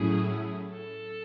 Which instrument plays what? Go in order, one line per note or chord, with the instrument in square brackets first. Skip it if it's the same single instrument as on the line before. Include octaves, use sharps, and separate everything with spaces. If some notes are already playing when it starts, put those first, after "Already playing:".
Already playing: [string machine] A2 F#3 A3 C#4 E4 [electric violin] G#4
[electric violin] A4